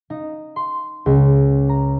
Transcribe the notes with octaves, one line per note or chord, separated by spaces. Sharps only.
D#4
C6
C#2
A#5